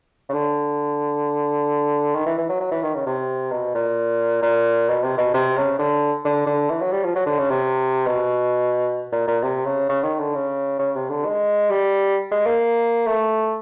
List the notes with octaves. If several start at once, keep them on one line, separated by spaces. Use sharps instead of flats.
C#3
D3
D#3
E3
E3
F#3
F#3
E3
D#3
C#3
C3
B2
A#2
A#2
B2
C3
B2
C3
C#3
D3
D3
D3
E3
F#3
G3
F3
F#3
D3
C#3
C3
B2
A#2
A#2
C3
C#3
C#3
D#3
D3
C#3
C#3
C3
D3
G#3
G3
G#3
A#3
A3